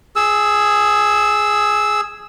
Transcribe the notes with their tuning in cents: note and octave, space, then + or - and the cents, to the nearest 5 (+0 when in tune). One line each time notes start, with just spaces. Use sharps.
G#4 +0 E6 -10